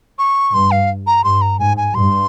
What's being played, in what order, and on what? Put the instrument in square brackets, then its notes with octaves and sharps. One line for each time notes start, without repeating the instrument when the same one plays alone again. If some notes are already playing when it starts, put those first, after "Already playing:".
[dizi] C#6
[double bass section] G2 [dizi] C6
[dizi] F5
A#5
[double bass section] G2 [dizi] C6
[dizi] A#5
[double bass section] G#2 [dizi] G#5
[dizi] G#5
[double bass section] G2 [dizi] C6